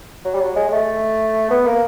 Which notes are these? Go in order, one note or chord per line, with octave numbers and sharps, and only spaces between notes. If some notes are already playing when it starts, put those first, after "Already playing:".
F#3
G3
F#3
G#3
G#3
A3
B3
A#3